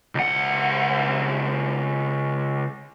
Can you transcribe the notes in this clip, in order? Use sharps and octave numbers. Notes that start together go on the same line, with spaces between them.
C#2 F#5